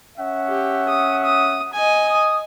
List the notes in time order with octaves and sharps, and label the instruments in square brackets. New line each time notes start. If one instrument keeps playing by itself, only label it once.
[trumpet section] C#4 E5 F#5
[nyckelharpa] G4
D#6
D#6
D#5 G#5
[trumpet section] D#6